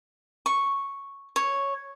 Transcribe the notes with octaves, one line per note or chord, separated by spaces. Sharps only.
C#6
C#5